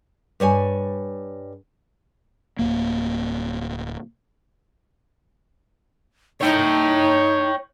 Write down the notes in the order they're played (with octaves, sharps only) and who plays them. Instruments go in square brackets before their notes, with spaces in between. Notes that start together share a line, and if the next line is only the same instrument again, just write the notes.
[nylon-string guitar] G2 G3 C#5 G#5
[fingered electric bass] D1 C2 A#3
[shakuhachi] D#4 [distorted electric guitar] C#5 G5